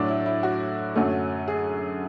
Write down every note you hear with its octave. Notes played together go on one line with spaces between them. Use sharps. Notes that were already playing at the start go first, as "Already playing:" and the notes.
Already playing: A2 F#3 A3 D4
E4
E4
F#4
F#2 D3 F#3 A3
G#4